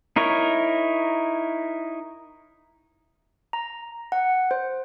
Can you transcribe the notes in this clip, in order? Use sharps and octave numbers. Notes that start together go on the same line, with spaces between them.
D#4 E4 A#4 C#5
A#5
F#5
C5